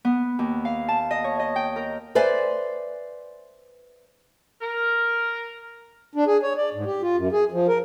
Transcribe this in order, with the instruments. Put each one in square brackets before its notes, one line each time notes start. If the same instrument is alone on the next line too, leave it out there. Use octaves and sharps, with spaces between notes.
[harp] B3
D#2
F5
A5
D#5
C#5
D#5
G5
A#4
[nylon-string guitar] B4 C5 D5 E5 G#5
[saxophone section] A#4
[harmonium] D4
G#4
C#5
D5
G#2
G4
F4
F#2
G#4
F3
A#4